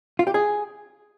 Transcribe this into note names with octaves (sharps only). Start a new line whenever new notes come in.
F4
G4
G#4